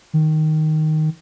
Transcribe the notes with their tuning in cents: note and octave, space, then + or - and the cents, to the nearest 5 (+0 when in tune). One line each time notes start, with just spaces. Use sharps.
D#3 +0